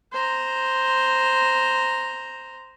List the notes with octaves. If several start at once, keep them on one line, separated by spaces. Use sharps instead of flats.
C5 A#5